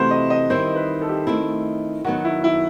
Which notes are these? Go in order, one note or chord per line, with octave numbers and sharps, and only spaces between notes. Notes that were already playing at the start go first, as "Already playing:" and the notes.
Already playing: C3 E3 A3 C4 F#4 B4 C5
D#5
D#5
D#3 G3 C4 E4 C5
B4
A4
G4
A4
D#3 A3 C4 E4
D#3 F#3 B3 F#4
E4
E4